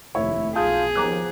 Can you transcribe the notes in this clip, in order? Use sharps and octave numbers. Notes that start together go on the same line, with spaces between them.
F1 D#2 A3 E4 C#5
B1 F4 G#4 A5 D#6 G6
D#2 F3 B3 A#5 D6 F#6